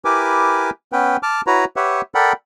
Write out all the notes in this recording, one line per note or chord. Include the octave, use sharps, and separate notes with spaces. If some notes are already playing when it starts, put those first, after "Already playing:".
E4 G4 A#4 B4 G#5 D6
B3 C#4 B4 G5
A5 D6 F6
E4 F#4 B4 C#5 A#5
G4 B4 C#5 E5 F#5
A4 A#4 D5 F#5 G5 B5